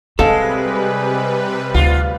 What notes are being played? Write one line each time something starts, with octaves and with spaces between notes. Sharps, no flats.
C3 G3 G#3 C4 A4 B4 F5
D2 F4